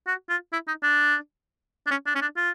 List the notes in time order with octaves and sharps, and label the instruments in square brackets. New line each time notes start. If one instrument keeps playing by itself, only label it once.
[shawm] F#4
F4
E4
D#4
D4
D4
C#4
D4
C#4
D4
F4